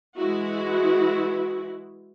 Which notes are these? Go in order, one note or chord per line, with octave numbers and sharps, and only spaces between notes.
E3 G#3 E4 F#4